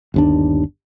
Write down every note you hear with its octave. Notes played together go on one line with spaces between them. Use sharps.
G1 D#2 D4